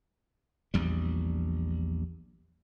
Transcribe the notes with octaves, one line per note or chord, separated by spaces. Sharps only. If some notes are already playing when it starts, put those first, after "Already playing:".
A#1 E2 G3